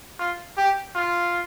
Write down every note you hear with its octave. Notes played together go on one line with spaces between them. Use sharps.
F4
G4
F4